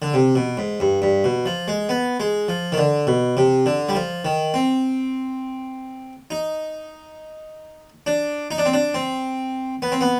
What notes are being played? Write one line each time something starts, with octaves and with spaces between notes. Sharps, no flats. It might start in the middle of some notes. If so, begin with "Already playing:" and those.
D3
C3
B2
G#2
G2
G2
B2
F3
G#3
B3
G#3
F3
D#3
D3
B2
C3
D3
G3
F3
D#3
C4
D#4
D4
D#4
D4
C4
D4
C4
B3
C4
B3